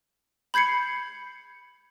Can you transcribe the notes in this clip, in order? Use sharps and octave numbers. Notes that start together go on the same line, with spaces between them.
B5 G6 G#6 C7 C#7